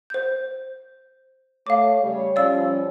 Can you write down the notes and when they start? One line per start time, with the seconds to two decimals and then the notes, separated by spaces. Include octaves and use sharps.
0.10 C5 G6
1.67 A3 C#5 F5 D6
2.03 C#3 G3 C#5
2.36 F3 G3 C#4 D5 F5 E6